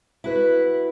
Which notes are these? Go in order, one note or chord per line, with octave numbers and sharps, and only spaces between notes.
E4 F#4 B4